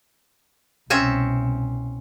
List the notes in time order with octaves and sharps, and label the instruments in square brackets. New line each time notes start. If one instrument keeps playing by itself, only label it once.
[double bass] C2 B2 [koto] C4 C#4 E5